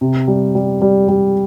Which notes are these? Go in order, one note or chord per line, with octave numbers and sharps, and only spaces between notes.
C3
G3
G3
G3
G3